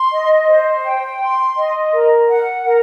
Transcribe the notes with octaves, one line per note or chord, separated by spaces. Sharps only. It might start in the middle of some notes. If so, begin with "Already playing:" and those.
Already playing: C6
D#5
C5
G5
C6
D#5
A#4
F#5
A#4